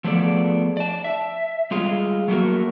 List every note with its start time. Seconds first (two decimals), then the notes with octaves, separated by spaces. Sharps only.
0.04 F3 A3 B3 G#4 A4 D5
0.77 D5 A5
1.04 E5
1.71 G3 G#3 F4 G#4
2.28 F#3 A3 A#3 F#4 A#4